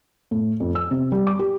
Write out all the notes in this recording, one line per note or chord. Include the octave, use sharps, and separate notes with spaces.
A2
F2
E6
C3
G3
D6
G4